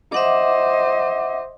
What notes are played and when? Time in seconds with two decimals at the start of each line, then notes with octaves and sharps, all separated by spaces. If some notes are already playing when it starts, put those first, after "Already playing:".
0.12 C5 D#5 E5 F#5 D6